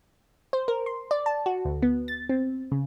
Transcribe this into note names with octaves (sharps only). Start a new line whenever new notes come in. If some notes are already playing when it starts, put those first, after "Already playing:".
C5
A#4
C6
D5
A5
F#4
D2
B3
A6
C4
C#3